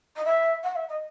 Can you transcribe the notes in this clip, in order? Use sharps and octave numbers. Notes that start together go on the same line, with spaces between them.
D#5
E5
F#5
E5
D#5